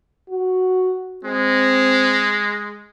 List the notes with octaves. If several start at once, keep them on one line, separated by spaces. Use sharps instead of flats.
F#4
G#3 C4